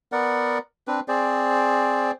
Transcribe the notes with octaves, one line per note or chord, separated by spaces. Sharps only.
B3 A#4 D5 F#5
C4 D4 B4
C4 G#4 C5 D5